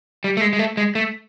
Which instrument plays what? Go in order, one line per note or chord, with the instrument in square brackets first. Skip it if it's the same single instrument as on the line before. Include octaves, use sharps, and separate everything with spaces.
[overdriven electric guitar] G3
A3
G#3
G#3
A3
G#3
A3